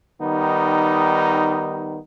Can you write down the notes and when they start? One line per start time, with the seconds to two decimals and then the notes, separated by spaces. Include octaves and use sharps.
0.21 D#3 G3 B3 D#4